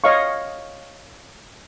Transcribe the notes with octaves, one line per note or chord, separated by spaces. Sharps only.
C#5 D#5 F5 C#6